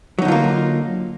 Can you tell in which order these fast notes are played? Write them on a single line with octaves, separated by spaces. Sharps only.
F#3 D#4 D3 F4 A#3